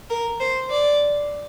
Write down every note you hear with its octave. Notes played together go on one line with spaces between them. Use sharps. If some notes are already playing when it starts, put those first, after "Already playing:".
A#4
C5
D5